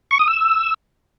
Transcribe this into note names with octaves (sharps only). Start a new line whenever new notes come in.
C#6
D#6
E6